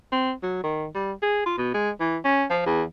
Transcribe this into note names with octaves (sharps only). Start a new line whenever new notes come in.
C4
F#3
D#3
G3
G#4
F4
B2
G#3
E3
C#4
F3
E2